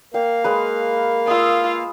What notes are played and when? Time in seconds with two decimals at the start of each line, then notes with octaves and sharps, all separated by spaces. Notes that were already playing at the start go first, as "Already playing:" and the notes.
0.14 A#3 A#4 F5 G5
0.44 G#3 B4
1.27 F4 D#6 E6